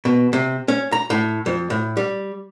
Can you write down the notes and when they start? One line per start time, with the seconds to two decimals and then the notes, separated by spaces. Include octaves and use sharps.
0.05 B2
0.33 C3
0.68 C#4
0.92 A#5
1.10 A2
1.46 F2
1.70 A2
1.97 G3